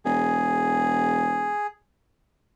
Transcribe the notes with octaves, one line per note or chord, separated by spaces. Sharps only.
E1 G#4